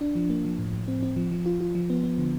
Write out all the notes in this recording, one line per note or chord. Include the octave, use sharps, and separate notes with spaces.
D4
F3
A#3
F3
A2
A2
C4
C4
F3
F3
F4
F4
F3
B3
B3
D3